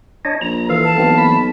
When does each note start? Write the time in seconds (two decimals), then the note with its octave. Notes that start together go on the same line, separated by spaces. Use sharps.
0.25 D4 C#5 D#5
0.41 A#1 A#5
0.69 E3 A4 F5
0.84 A5
0.98 B1 E3 A#3 C4
1.17 B5